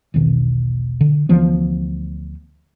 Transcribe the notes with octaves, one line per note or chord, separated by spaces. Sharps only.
E1 B1 B2 D#3
D3
D2 E3 F3 B3